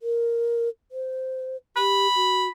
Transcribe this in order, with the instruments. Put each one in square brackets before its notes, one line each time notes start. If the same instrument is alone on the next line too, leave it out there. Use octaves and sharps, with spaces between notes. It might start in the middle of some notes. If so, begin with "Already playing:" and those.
[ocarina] A#4
C5
[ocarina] G4 [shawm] B5
[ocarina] F#4